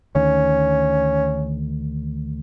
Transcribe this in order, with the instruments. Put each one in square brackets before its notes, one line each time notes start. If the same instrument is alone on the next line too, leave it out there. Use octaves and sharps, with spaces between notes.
[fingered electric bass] D2 D#3 [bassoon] C#4